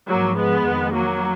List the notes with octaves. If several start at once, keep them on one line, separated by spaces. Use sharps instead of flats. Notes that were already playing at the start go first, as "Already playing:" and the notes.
G#2 F3 F#3 A#3
G#3 B3
F2 D#3
F#3 A#3